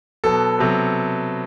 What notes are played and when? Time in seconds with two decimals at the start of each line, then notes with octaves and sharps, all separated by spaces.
0.24 B2 F#3 B3 A4
0.59 C3 F#3 B3